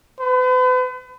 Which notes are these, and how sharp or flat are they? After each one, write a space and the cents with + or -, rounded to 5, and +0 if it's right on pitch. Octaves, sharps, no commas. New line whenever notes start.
B4 +40